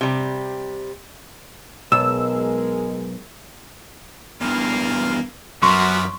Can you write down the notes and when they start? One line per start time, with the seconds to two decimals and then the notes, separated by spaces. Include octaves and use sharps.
0.01 C3 G3
1.92 B1 G#3 A#4 E6
4.41 E2 G2 A#3 F4
5.62 F#2 G3 B3 F#4 A#4 C6 C#6